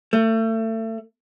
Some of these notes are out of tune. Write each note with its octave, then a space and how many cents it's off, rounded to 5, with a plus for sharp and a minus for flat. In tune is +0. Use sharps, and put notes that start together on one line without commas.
A3 +30